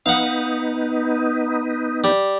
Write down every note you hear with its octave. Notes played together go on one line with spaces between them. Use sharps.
B3 D#4 F5 F#5
G3